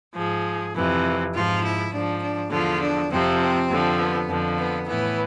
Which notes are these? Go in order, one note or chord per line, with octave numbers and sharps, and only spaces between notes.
G#2 F3 G#4
F2 C3 E3
G#2 F3 F4
E4
G#2 F3 D4
D4
E2 D3 F3 F4
D4
F2 C3 F3 C4
C4
F2 D3 F3
B3
F2 D3 F3
B3
A2 E3 B3